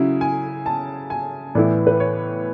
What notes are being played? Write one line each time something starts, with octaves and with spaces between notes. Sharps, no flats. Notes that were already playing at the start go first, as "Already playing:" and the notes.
Already playing: C#3 F#3 C#4 E4
G#5
A5
G#5
A2 E3 B3 E4 D5
B4
C#5